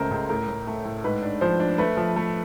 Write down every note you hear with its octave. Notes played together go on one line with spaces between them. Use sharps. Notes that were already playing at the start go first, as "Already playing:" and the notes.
Already playing: C#2 C#3 A3 A#4 C5
C#2
A2 A#4
A2
A3
A2
G#2 B4
D4
F3 C5
D4
A3 B4
F3
A3